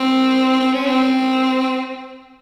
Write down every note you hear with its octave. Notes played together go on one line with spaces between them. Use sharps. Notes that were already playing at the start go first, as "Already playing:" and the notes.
Already playing: C4
C4
C#4
C4